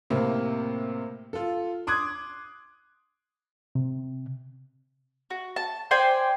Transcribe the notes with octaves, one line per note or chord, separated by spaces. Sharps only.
A2 C3 A#3
F4 A4
C6 D6 D#6 F#6 G#6
C3
F#4
A5
C5 D5 G5 G#5